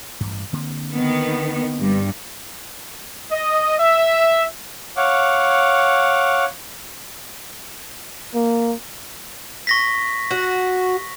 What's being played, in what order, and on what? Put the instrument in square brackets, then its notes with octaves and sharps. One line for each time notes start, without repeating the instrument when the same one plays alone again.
[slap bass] A1 G2
D3 A#3 C4
[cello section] D#3 B3
G2
[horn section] D#5
E5
[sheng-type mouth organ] C#5 F5 F#5 D6
[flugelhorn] A#3
[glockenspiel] C#6 A#6 B6
[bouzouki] F#4